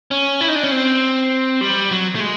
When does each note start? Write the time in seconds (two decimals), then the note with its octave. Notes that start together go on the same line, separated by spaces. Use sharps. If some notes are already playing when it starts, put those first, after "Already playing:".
0.11 C#4
0.41 E4
0.48 D#4
0.55 D4
0.64 C#4
0.71 C4
1.61 G3
1.91 F#3
2.15 A3
2.20 G#3